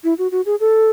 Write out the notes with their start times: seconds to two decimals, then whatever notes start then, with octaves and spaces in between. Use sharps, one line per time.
0.04 E4
0.18 F#4
0.32 F#4
0.46 G#4
0.60 A4